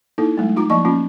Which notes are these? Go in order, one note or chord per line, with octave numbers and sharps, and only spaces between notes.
A#3 D#4 E4 A4
F#3 G#3 A3
D#4 F4 A#5 D6
F3 A#3 D#5 C#6
A#3 C#4 F4